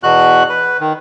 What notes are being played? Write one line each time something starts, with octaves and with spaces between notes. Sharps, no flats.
E2 B2 F#4 F#6
B4
D#3